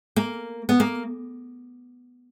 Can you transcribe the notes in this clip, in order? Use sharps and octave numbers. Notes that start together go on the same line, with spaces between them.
A#3
B3
A#3